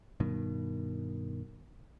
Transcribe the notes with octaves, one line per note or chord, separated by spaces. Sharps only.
G2 B2 D#3